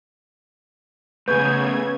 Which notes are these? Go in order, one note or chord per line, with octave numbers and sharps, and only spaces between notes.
C#3 A3 B3 B4 G#5 C#6 G6 G#6